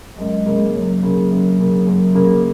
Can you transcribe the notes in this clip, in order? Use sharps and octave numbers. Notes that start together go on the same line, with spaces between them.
F#2 G#3
C#3 A#3
F#2 F#3
C#3 A#3
F#2
C#3 A#3
F#2
C#3 A#3